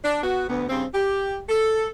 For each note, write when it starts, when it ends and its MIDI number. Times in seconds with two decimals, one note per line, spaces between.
0.04 0.22 62
0.23 0.44 59
0.23 0.44 66
0.49 0.65 38
0.49 0.65 59
0.69 0.85 43
0.69 0.85 49
0.69 0.85 60
0.94 1.38 67
1.49 1.88 69